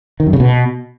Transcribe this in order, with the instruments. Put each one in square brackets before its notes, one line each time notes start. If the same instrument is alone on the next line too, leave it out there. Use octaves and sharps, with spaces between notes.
[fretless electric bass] D#3
F#2
C#3
B2